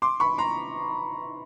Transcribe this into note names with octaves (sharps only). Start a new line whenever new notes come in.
C6 D6
B5 C#6
A#5 C6